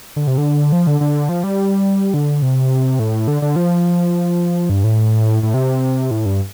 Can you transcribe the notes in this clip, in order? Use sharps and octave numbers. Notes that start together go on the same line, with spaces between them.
D3
C3
D3
F3
D3
D3
F3
G3
D3
C3
A2
D3
D3
F3
G2
A2
A2
C3
A2
G2